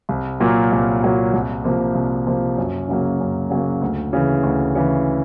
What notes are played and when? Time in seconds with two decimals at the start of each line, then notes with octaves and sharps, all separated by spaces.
0.09 C2
0.40 A#2 F#3 A#3
0.72 C2
1.03 A#2 F#3 A#3
1.33 C2
1.64 C3 F3 A#3
1.95 C2
2.27 C3 F3 A#3
2.57 F#2
2.88 C#3 F#3 A#3
3.20 F#2
3.50 C#3 F#3 A#3
3.82 D2
4.13 C#3 E3
4.43 D2
4.75 C#3 E3